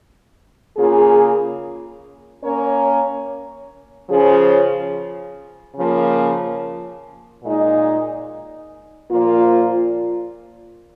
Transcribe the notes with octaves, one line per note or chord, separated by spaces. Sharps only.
C#3 A#3 F4 G#4
A#3 C#4 A#4 C#5
C#3 F3 C#4 G#4
C#3 F3 A#3
A#2 G#3 D#4
A#2 F3 A#3 F4